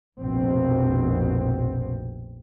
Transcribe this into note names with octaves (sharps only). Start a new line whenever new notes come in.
F1 A#1 B2 C4